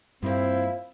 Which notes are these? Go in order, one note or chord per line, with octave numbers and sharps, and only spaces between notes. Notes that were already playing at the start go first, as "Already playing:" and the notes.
G2 F3 A#3 C4 E4